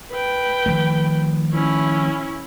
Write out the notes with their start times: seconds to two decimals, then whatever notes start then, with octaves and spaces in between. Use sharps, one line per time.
0.11 B4 G5
0.66 D#3 F3 A3
1.53 C#4 E4